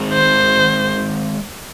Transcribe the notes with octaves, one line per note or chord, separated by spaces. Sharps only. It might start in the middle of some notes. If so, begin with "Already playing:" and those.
Already playing: D#3 G#3 C4
C5